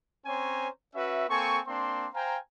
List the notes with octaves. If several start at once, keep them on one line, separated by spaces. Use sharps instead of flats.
C4 C#4 C5 C#5 G#5 A#5
C#4 F#4 B4 E5
A#3 C4 A4 G#5 C#6
A#3 C4 D4 C6
C5 F5 G5 G#5 A#5